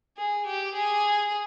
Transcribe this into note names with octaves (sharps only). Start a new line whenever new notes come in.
G#4
G4
G#4